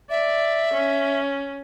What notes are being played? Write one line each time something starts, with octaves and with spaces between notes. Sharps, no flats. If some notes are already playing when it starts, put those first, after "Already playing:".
D5 E5
C#4